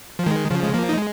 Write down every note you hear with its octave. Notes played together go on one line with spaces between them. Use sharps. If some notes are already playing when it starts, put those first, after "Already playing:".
F3
D#3 G#3
C#3 F3
G#3
F3 A#3
D#4
G#3